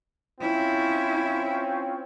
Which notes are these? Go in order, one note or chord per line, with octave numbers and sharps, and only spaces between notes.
C4 C#4 E4 F4